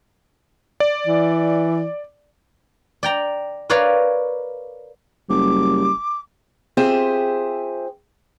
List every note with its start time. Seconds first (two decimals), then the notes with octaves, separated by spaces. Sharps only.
0.80 D5
1.07 E3
3.03 D5 G5 A#5
3.70 A#4 B4 C#5 D5 F5
5.29 F#1 G3 D6
6.77 C4 F4 G4 G#4 C5 E5